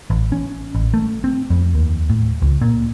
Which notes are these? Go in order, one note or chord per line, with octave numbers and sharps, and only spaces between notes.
A1
C#4
A1
A3
C4
F2
D#2
A2
C#2
A#2